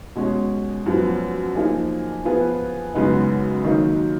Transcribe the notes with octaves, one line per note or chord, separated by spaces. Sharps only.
B2 G#3 C#4
F#2 F3 B3
F3 A#3 D#4 G#4
F3 B3 F4 G#4 B4
F#2 C#3 G#3 B3 D#4
D#3 F#3 A#3 D#4